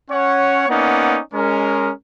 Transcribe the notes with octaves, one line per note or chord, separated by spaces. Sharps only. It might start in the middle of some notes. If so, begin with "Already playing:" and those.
C#4 C#5 F#5
A#3 B3 C#4 D#4 D5 F#5
G#3 C#4 A#4